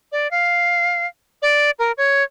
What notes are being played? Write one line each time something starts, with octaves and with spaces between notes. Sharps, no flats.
D5
F5
D5
A#4
C#5